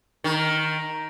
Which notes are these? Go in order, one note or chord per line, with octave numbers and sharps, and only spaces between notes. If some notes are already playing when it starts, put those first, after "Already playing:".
D#3